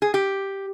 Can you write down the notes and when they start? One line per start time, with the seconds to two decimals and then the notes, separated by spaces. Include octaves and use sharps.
0.02 G#4
0.14 G4